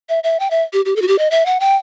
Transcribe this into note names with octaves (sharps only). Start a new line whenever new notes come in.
E5
E5
G5
E5
G4
G4
A4
F#4
G4
D#5
E5
F#5
G5